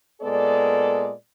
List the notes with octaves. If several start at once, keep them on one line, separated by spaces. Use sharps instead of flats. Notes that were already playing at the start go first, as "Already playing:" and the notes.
A#2 G#3 B3 A4 D5